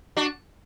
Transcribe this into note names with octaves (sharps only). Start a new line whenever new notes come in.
D4 F#4